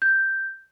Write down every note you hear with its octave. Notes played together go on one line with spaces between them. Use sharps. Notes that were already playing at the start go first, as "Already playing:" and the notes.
G6